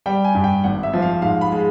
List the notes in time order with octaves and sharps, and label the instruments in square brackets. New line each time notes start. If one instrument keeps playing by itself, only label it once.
[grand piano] G3 G5
G#5
G2
G5
G#1 F#5
E5
F3
F5
G#2 F5
B5
G#3